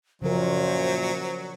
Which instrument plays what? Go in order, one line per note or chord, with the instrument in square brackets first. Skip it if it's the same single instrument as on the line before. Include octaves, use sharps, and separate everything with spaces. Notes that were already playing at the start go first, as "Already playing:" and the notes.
[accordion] F#2 A#2 [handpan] C#3 F3 A#4 [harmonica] F#3 [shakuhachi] C5